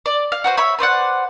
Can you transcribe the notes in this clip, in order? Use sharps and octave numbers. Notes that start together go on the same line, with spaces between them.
D5
F5
F#4 B4 C5
C#5 E5 B5
B4 C5 D5 F#5